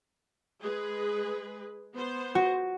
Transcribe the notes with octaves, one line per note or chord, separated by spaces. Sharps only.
G#3 G#4 B4
B3 C5
F#4